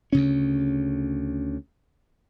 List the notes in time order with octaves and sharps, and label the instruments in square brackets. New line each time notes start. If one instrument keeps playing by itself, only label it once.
[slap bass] D2 C#3 C#4